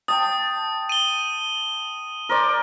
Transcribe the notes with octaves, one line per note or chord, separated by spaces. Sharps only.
G5 A5 D#6
D#7 G7
A#4 C5 D5